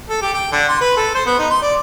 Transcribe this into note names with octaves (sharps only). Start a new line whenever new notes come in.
A4
G4
G5
D3
C6
B4
A4
C5
B3
D#4
C6
D5